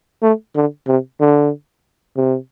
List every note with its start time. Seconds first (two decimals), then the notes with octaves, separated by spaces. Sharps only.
0.22 A3
0.56 D3
0.87 C3
1.20 D3
2.17 C3